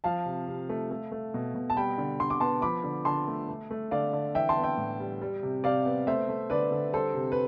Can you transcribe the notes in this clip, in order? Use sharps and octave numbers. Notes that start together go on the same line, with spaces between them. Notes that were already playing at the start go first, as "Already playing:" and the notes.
F3 F5 A5
C3
C3
A3
A3
A3
B2
B2
A5
G3 G5 B5
D3
D3 C6
D6
B3 A5 C6
F3 B5 D6
D3
D3 A5 C6
A3
A3
A3
D3 D5 F5
D3
E3 E5 G5
A5 C6
B3
E5 G5
A2
G3
G3
C3
C3 D5 F5
B3
A3 C5 E5
A3
D3 B4 D5
D3
G3 A4 C5
C3
B4